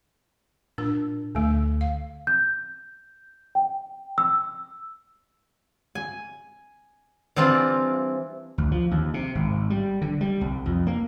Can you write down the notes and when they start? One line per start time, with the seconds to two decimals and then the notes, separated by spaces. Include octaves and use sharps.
0.78 A#2 D4 A#4
1.35 D2 D3 A3
1.81 F5
2.27 G6
3.55 G5
4.18 E6
5.95 G#5
7.36 E3 G3 C4 D4 F4
8.58 D2
8.71 F3
8.91 D#2
9.14 C3
9.35 G#1
9.70 G3
10.02 D3
10.21 G3
10.41 C2
10.66 F2
10.87 A#3